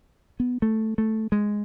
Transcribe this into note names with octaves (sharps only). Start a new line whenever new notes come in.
B3
A3
A3
G#3